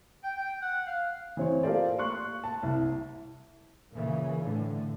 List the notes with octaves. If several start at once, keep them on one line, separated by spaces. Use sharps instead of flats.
G5
G5
F#5
F5
E3 C4 C#5
F4 G4 A4 A#4 C5 D5
C6 C#6 F#6
A5
C2
A#2 C#3 E3
A2 D3